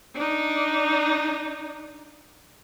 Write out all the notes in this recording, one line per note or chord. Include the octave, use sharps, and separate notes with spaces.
D4 D#4